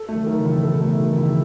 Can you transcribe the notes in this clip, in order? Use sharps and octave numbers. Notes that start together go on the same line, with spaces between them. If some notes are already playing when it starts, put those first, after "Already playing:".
Already playing: A4
A3
D#3 F#3
D#3
C#3 E3
E4
B2 D#3 A4
A3
B2 D#3
D#3
C#3 E3
E4